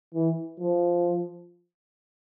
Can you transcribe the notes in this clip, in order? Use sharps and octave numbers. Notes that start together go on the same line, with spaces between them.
E3
F3